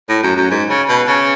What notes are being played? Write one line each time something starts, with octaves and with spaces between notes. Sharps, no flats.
A2
F#2
F#2
G#2
C#3
B2
C#3